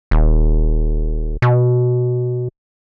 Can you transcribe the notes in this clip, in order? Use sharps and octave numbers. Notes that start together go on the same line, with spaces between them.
D#1
B2